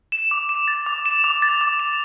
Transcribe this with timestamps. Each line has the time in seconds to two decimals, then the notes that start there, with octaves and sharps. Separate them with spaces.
0.12 E7
0.31 D6
0.49 E7
0.68 A6
0.86 D6
1.06 E7
1.24 D6
1.42 A6
1.61 D6
1.80 E7